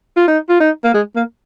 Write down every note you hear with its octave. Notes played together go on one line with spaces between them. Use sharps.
F4
D#4
F4
D#4
A#3
G#3
A#3